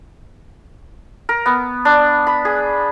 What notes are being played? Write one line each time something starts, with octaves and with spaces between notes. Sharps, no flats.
A#4
B3
D4
B5
G#4